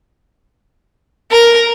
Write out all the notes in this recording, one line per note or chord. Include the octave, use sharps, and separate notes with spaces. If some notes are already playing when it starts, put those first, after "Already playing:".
A#4